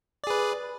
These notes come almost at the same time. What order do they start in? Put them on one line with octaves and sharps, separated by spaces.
D5 G#4 B4